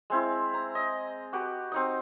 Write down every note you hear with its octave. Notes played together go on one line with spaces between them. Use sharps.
G#3 C4 E4
A#5
D#5
F#4 G4 B4
C4 D#4 D#6